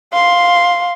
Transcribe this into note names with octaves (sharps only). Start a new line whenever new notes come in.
F5 C6